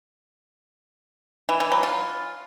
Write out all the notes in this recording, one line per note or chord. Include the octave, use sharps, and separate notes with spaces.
E3
E3
F#3
F4